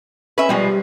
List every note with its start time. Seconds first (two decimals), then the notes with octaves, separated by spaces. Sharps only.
0.38 C#4 B4 E5
0.49 B2 F3 G3 G#3